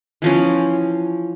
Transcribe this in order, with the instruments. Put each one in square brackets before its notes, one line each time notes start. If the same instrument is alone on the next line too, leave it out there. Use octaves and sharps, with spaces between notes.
[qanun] E3 F3 C#4